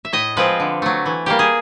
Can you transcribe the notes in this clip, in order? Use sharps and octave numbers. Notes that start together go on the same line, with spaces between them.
E5
A2 D#5
F3 G#3 C4 B4
D3
F#3 A3
E3
G3 A#3 G4
G#4